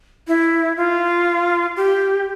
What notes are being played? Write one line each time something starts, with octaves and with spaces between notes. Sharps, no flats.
E4
F4
G4